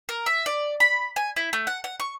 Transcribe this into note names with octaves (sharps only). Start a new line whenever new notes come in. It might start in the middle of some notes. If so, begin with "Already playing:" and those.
A#4
E5
D5
B5
G#5
E4
A3
F#5
F#5
C#6